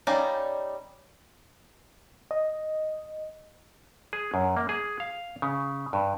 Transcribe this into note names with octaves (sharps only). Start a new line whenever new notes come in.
G3 C#4 D#4 D5 F5
D#5
G#4
F#2
A#3
G#4
F5
C#3
G2